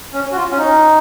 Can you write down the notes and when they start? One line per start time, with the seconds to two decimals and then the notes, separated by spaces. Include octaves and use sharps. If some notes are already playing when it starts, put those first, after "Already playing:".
0.13 C#4
0.32 F#4
0.36 F4
0.52 C#4
0.58 D#4